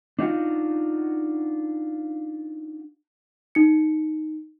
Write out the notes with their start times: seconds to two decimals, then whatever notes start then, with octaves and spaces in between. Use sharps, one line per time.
0.19 D4 D#4 F4 F#4
3.55 D#4 C#7